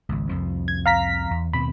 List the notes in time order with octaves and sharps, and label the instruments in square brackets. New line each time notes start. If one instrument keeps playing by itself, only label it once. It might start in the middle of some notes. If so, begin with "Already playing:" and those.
[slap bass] G#1 C#2
C2 F2 F3
[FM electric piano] G#6
F5 A#5 B6
[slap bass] E2
[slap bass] D#2 B2 C4 [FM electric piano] B5